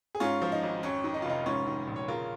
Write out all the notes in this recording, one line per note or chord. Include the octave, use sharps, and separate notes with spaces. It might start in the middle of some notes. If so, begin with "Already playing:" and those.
G#4
G#2 C#4 F4
F3
D#4
G#1
F2 C#4
D#3
D#4
F4
F1 D#4
G#2 C#4 F4
D#3
A#1
C#5
C#3 F4 A#4